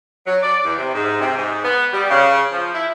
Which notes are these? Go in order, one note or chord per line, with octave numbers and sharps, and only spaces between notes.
F#3
D5
E2
C3
G#2
C3
G#2
B3
G3
C#3
F3
E4